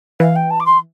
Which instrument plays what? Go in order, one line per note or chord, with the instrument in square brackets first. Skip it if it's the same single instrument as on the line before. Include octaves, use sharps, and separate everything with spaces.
[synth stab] E3 [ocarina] F5
[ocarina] G5
A5
D6
C6